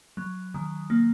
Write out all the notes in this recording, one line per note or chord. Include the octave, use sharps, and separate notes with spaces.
F#3
D#3
A#3